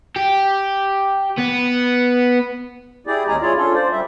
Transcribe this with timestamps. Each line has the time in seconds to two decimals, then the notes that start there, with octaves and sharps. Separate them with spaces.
0.16 G4
1.38 B3
3.07 E4 G4 G#4 D5
3.28 D#2 G#3 C#4 G#4 G#5 A#5
3.41 E4 F4 G#4 C#5 D5
3.57 C#4 D4 F4 A4
3.74 C5 D5
3.92 G3 E5